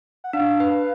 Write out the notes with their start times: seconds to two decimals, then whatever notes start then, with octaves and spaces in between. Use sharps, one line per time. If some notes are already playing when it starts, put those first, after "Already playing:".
0.24 F#5
0.33 D4 F5
0.60 B4